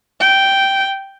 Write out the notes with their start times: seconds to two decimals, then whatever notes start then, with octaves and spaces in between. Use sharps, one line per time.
0.21 G5